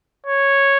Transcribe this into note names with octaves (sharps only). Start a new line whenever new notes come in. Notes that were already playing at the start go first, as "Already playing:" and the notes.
C#5